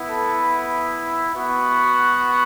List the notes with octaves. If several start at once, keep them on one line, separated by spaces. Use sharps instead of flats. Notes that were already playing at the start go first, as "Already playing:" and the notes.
Already playing: B3 E4
A4
B3 F#4